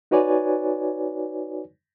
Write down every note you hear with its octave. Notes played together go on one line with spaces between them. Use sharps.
D#4 F#4 B4 C#5 D5 G#5